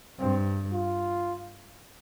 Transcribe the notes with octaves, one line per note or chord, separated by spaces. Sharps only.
G2 C4
F4